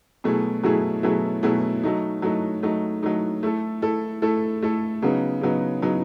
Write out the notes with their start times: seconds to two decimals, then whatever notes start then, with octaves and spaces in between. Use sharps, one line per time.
0.24 B2 F#3 A3 E4 G#4
0.63 B2 F#3 A3 E4 G#4
1.03 B2 F#3 A3 E4 G#4
1.43 B2 F#3 A3 E4 G#4
1.83 F#3 A3 D#4
2.22 F#3 A3 D#4
2.63 F#3 A3 D#4
3.03 F#3 A3 D#4
3.43 A3 E4 A4
3.82 A3 E4 A4
4.22 A3 E4 A4
4.63 A3 E4 A4
5.02 C#3 F#3 B3 D#4
5.41 C#3 F#3 B3 D#4
5.82 C#3 F#3 B3 D#4